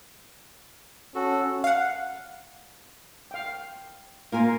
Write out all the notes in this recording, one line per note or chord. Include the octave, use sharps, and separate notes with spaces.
C#4 F#4 A4
F5 F#5
F5 G5
A#3 F4 A#4 F5 G#5